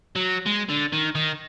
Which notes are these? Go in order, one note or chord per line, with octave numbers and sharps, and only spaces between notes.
F#3
G#3
D3
D#3
D#3